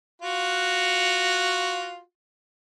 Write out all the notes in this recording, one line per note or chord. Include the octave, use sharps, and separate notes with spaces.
F4 F#4